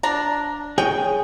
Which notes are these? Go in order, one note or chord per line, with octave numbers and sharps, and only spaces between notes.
D4 A#5
G#4 C#5 D#5 G5